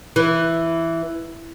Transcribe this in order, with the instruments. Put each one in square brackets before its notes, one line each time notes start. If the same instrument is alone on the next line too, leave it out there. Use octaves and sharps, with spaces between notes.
[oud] E3